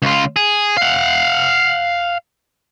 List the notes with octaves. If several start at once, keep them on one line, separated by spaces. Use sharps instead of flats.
C#2 F4
G#4
F5 F#5